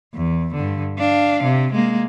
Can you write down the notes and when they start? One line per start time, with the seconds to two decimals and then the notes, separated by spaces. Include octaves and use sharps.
0.14 E2
0.54 G2 D3
0.98 D4 F5
1.43 C3
1.73 G#3 A#3